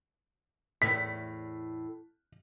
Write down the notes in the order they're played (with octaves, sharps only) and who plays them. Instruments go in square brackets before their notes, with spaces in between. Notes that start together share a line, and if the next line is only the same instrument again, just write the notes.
[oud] E2 A2 [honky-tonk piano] B6